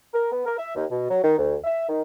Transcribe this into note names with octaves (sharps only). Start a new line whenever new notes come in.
A#4
B3
A#4
E5
D#2
B2
F#3
D#3
D2
E5
D#3